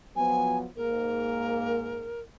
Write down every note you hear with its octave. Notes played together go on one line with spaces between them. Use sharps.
F3 F#3 B3 G#5
G#2 A#3 A#4